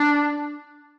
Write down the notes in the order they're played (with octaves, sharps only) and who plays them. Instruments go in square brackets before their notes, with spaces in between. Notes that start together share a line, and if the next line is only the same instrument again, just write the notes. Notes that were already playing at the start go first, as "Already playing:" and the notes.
Already playing: [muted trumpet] D4